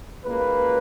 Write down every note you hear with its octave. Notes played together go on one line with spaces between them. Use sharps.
C#2 B2 A#3 B4